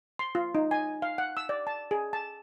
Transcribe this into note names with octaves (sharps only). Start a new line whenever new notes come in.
C6
F4
D#4
G#5
F5
F#5
E6
D5
A5
G#4
A5